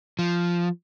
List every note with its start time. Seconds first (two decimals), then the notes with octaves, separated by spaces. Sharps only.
0.19 F3